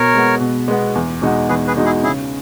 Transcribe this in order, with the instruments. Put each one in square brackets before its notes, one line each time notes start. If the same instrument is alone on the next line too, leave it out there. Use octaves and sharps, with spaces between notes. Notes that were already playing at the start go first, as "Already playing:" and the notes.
Already playing: [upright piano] B2 [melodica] A#4 C#5
[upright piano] G#3 B3
B2
G#3 B3
E2
B2 G#3 D#4 F#4
[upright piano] E2 [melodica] G#4 B4
[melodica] G#4 B4
[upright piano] B2 G#3 D#4 F#4
[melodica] E4 G#4
[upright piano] C#3 [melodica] E4 G#4